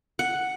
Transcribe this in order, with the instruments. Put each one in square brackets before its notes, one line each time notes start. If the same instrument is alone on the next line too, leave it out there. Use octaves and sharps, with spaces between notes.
[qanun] F#5